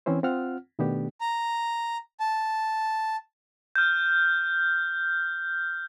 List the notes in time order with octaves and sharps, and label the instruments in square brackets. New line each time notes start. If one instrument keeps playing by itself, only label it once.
[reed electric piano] E3 C4 C#4 E4 C5
C4 F4 F#5 F6
B2 D#3 A3 B3 D4 G4
[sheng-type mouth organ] A#5
A5
[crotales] F6 G6